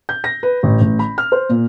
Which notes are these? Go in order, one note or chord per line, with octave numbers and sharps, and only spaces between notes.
G6
A#6
B4
A1
A1
B5
F6
C5
A#2